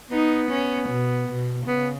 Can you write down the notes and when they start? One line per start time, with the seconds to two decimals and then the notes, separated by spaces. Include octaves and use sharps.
0.11 B3 D#4
0.50 C#4
0.89 B2
1.28 B2
1.67 C#3 B3